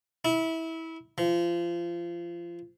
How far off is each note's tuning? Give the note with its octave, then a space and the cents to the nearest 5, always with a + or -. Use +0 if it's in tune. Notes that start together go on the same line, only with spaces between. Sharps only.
E4 -20
F3 -25